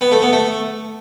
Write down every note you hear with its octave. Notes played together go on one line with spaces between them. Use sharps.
B3
A3
B3
A3